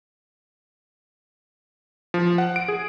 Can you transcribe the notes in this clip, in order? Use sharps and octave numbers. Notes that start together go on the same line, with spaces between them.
F3
F#5
D7
G#4